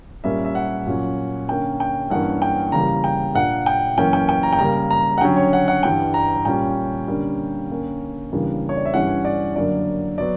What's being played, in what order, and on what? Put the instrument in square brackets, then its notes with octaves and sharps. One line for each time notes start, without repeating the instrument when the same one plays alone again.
[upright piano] A#2 G3 A#3 C#4 E5
E5
F#5
A#2 F#3 C#4
D3 A#3 C#4 G5
G5
G2 E3 A#3 C#4 F#5
G5
E2 C#3 G3 A#3 A#5
G5
A#2 A#3 D4 F#5
G5
F#2 E3 A#3 C#4 G5
G5
G5
A#5
G5
C#3 G3 A#3 A#5
A#5
F#5
D3 F#3 C#4 G5
C#5
F#5
F#5
G2 E3 G3 G5
A#5
A#2 G3 C#4 G5
D3 G3 A#3 C#4
D3 A#3 C#4
E2 C#3 G3 A#3 D4
C#5
D5
E5
G2 E3 G3 C#4 F#5
D5
F#2 D3 F#3 A#3 D5
F#3 B3 D5